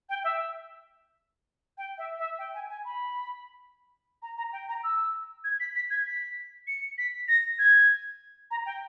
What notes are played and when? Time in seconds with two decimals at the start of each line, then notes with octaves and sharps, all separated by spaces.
0.09 G5
0.24 E5
1.78 G5
1.98 E5
2.19 E5
2.38 G5
2.54 G#5
2.69 G#5
2.85 B5
4.22 A#5
4.38 A#5
4.53 G5
4.69 A#5
4.84 E6
5.44 G#6
5.60 B6
5.75 B6
5.90 G#6
6.07 B6
6.67 C#7
6.98 B6
7.28 A#6
7.59 G#6
8.51 A#5
8.66 G5